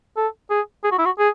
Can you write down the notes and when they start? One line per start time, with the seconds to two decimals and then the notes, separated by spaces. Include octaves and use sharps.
0.17 A4
0.50 G#4
0.84 G#4
0.91 F#4
0.98 E4
1.05 F#4
1.19 G#4